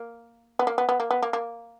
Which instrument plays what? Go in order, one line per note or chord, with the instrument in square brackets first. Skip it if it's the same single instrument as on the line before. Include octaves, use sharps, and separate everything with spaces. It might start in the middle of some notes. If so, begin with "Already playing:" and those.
Already playing: [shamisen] A#3
B3
A#3
B3
B3
A#3
B3
A#3
A#3